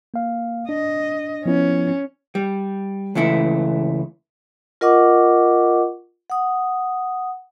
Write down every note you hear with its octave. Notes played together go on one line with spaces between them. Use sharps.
A#3 F5
D4 D#5
F3 B3 C#4 E4
G3
C#2 E3 A3 E4
F4 A#4 D#5 F#5 C#6 D6
F#5 D#6